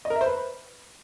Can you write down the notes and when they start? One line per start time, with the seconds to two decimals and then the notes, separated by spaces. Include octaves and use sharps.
0.05 D#5
0.10 A#4
0.16 E5
0.21 C5
0.26 B4